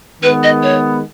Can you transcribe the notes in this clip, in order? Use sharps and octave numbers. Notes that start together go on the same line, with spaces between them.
D#3 G#3 B3 B4
D#5
C#5